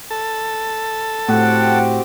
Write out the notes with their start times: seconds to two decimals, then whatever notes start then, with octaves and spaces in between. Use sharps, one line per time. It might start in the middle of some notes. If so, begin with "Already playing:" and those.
0.11 A4
1.29 A2 C4 F#4 G4 F#5